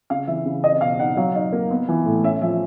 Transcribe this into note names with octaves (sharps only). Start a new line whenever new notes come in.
C#3 F5
E3 E5
C#3
C4 D#5
B2 F5
D#4 F#5
F#3 F5
D#4
A#3
B3
E3
A2
C#4 E5
F3 E5